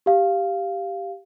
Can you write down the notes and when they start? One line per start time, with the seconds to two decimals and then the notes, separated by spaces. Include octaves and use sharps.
0.06 G4 F5